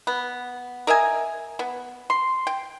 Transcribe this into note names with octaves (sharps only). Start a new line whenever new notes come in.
B3
A#4 D#5 E5 G#5
B3
C6
G5